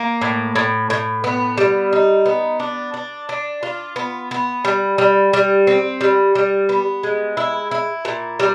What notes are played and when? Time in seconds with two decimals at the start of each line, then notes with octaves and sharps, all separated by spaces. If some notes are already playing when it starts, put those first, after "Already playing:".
Already playing: A#3
0.21 A2
0.56 A2
0.90 A2
1.24 B3
1.58 G3
1.93 D#4
2.26 B3
2.60 D4
2.94 D4
3.29 D4
3.63 F4
3.96 B3
4.31 B3
4.65 G3
4.98 G3
5.33 G3
5.67 C4
6.01 G3
6.35 G3
6.69 B3
7.03 G#3
7.37 E4
7.71 E4
8.05 A#2
8.39 G3